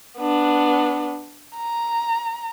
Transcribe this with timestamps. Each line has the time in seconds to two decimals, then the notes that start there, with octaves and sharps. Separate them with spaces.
0.19 B3 D4
1.57 A#5